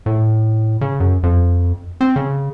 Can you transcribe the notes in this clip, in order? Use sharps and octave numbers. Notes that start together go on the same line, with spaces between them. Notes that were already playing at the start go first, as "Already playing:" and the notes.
A2
C#3
F#2
F2
C4
C#3